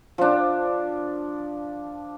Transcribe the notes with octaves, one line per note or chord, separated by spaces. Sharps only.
F3 D4